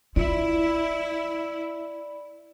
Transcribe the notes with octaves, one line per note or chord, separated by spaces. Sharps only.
E4 F4 D5 B5